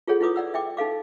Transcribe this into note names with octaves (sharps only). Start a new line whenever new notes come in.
F4 G#4 A4 C#5 F#5
E4 F4 B4 D6 D#6
D5 F#5 E6
E5 G5 D6
D#4 A4 F5 D6